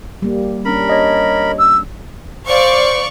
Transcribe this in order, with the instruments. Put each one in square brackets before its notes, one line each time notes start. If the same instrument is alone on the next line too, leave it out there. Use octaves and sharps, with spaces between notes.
[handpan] G3 A#3
[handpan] C#4 D4 [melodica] A#4 B5
[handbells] C#5 D#5
[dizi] E6
[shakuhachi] C5 [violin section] D5 F5 C#6